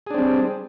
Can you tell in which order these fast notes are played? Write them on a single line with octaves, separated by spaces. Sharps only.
G#4 D4 C4 G3